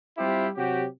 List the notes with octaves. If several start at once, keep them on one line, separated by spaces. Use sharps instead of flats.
G3 C4 E4 F4 G4
C3 F#3 F#4 G4